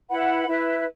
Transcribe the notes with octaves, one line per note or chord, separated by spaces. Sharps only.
E4 B4 F#5 B5
E4 B4 E5